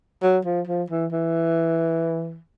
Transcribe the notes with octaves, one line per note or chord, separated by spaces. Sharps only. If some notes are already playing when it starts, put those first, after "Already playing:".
F#3
F3
F3
E3
E3